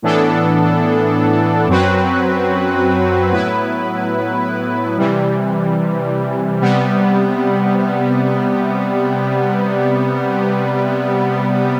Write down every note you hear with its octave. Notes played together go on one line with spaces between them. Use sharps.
A2 E3 B3 D4 A4
F#2 F#3 C4 F#4 B4
A2 F#3 B3 E4 B4
C3 E3 G3
C3 G3 B3